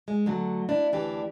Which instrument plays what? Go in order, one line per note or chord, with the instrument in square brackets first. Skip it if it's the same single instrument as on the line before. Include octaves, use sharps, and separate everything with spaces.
[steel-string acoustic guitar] G#3
D3 F#3 A3
D4 E4
D2 E3 D4 G4